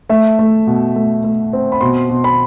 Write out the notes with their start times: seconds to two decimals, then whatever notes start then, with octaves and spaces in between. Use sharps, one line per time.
0.09 A3 E5
0.39 A3
0.67 B2
0.96 A3
1.24 A3
1.53 C4
1.72 B5
1.81 B2 C6
2.09 B2
2.24 B5